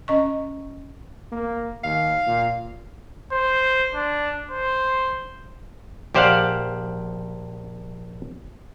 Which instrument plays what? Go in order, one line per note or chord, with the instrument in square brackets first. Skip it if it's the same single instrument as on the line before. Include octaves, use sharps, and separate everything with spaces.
[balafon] C#4 D#5 C#6
[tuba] A#3
[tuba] D#2 [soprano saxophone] F5
[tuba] A#2
[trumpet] C5
D4
C5
[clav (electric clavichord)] A#1 G4 C5 D5 F5 F#5